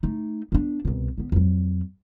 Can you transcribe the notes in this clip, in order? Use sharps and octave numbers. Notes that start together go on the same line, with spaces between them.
A3 D#4
B3 D4
C2 B2
D3 B3
F2 F#3